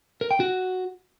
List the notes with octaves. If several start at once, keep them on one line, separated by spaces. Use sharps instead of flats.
A#4
G5
F#4